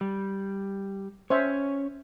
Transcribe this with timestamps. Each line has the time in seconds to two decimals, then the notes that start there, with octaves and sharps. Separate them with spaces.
0.01 G3
1.30 C#4 C5 C#5 E5